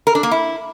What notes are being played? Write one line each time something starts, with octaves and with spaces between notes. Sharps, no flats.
A#4
D4
A#3
E4